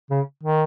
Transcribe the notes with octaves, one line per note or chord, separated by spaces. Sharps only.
C#3
D#3